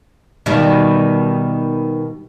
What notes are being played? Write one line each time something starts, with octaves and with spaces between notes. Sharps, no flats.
B2 D#3 G3